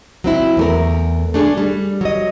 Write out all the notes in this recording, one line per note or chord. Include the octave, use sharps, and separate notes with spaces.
F#3 C4 E4
E2 A3 A#4
A3 D4 G#4
G3
F#3 D#5